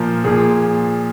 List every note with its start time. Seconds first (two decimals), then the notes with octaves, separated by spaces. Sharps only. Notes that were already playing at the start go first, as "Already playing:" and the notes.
Already playing: A#2 F3 A#4
0.24 A#2 F3 G#4